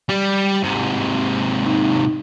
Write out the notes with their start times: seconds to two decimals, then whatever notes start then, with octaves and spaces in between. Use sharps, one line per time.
0.09 G3
0.63 G#2 C3
1.65 D#4